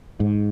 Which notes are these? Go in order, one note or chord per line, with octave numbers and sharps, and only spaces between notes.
G#2